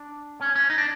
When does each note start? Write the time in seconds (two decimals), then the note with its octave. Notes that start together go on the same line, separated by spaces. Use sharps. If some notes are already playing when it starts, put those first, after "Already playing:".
Already playing: D4
0.41 C#4
0.55 C#4
0.70 D#4
0.78 D4